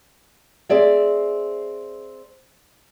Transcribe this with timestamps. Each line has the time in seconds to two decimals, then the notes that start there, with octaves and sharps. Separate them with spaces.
0.69 C4 G#4 D5 E5